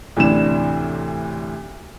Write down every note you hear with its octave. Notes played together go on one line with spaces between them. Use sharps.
D2 A2 C3 E3 D4 E7